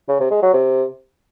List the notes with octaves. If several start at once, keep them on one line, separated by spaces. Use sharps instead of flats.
C#3
C3
G#3
F#3
C3